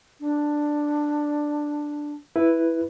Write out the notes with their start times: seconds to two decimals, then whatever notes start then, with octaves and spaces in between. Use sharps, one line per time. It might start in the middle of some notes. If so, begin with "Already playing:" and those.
0.20 D4
2.36 E4 B4